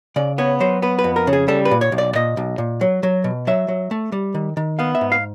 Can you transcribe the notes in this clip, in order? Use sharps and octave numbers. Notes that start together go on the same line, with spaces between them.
C#3 D5
B3 C#5
F#3 C5
B3 B4
B4
F2
A#4
C#3
G#4
G3 A4
B4
A#2
C#5
B1
D5
A#2 D#5
B1
A#2
F#3
F#3
B2
F#3 E5
F#3
A3
G3
D#3
D#3
B3 F5
E5
G#2
F5